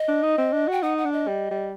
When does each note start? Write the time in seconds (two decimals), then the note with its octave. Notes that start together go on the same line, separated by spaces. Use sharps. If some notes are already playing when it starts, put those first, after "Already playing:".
Already playing: D#5
0.08 D4
0.23 D#4
0.38 C4
0.53 D4
0.68 F#4 G5
0.82 D#4 F#5
0.98 F#5
1.05 D4
1.12 D#5
1.28 G3
1.51 G3